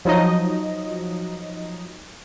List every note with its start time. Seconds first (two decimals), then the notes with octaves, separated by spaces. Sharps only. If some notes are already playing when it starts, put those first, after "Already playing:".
0.05 F3 F#3 D#4 D#5